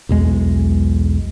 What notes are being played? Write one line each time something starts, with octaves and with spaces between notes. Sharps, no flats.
B1 E2 G#3